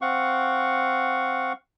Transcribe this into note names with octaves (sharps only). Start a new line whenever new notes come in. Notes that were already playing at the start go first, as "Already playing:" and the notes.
C4 F5 F#5 C#6